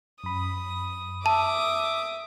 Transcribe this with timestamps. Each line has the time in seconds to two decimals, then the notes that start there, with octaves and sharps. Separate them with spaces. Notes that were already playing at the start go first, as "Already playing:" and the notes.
0.23 F#2 B5 D#6
1.26 E5 A5 D6 D#6